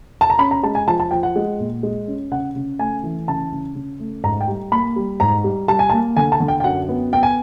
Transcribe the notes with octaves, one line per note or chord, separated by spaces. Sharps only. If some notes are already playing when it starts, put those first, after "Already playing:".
A5
A#5
C#4 B5
A#5
G#3 A5
G#5
F3 A5
A5
F3 G5
F#5
G#3
A#2
G#3
C#4
C#3 F#5
C#3
A3 G#5
E3
C#3 A5
C#3
C#3
A3
G#2 A#5
G5
G3
A#3 B5
G3
G#2 A#5
G3
G3 A5
G#5
A5
A#3
D3 G#5
A5
D3
G5
G5
F#2 F#5
B3
B3 G5
G#5